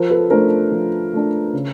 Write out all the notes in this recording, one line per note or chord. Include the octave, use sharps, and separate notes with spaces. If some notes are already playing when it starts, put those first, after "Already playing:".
Already playing: F3 A#4 C5
A4 B4
A3 D4 A#4 C5
F3
A3 D4
C#3